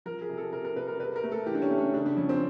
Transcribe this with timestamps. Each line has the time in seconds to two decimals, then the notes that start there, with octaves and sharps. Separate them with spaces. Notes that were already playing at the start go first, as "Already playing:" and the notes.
0.06 F3 A#4
0.21 G#4
0.29 C3
0.38 A4
0.52 C3 A#4
0.65 A#4
0.76 C3 B4
0.88 A#4
0.99 C3 B4
1.16 A#4
1.23 A3
1.32 A4
1.46 E3 G4
1.55 D4
1.62 C#4
1.71 A3
1.78 D4
1.94 C#3 D4
2.06 D4
2.17 F2 C#4
2.29 C4